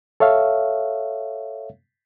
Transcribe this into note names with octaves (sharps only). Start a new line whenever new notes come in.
A4 C#5 E5 F5